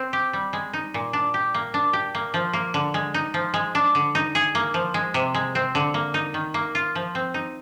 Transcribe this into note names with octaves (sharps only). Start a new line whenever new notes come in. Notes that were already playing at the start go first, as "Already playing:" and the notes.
Already playing: C4
G4
G3
G#3
D#4
A#2
D4
G4
A#3
D4
G4
A#3
F3
A#3
D3
G#3
D#4
F3
G#3
D4
D3
D#4
G#4
A#3
F3
G#3
C3
G#3
C4
D3
A#3
D#4
D#3
A#3
F4
F3
C4
D#4